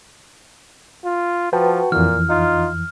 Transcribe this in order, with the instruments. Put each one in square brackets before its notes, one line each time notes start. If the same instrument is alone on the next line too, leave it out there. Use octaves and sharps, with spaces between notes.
[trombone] F4
[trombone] F3 [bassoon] F#4 [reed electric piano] B4 G5 A5
[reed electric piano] F2 E3 [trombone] A#2 [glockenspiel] F6
[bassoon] D#4 [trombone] F4